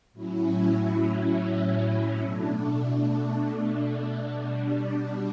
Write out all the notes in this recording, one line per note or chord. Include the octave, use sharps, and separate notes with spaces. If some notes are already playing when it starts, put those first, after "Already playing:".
A2 F#3 C#4 E4
B2 A3 D4
B2 G3 D4